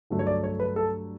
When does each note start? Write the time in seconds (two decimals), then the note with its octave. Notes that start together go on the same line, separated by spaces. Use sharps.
0.10 G2 D3 F#3 A3
0.19 C#5
0.27 D5
0.44 C#5
0.60 B4
0.76 A4